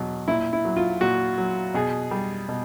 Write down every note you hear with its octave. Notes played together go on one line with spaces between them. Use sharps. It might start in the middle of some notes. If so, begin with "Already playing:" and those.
Already playing: E2 B2 F#3
A#2 E4
E4
F#3
F4
A#2 F#4
F#3
B2 G#4
G3
B2